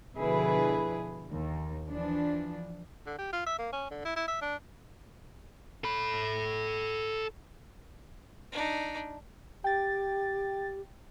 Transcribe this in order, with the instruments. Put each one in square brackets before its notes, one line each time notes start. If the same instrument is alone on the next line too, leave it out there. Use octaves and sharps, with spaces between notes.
[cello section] B2 D3 F3 E4 G#4 B4
D#2
E3 F3 D4
[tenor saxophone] D3
G4
F4
E5
A#3
C#4
D3
E4
E4
E5
D4
[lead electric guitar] A4 B5
[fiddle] D4 D#4
[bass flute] G4 [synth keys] G5 A6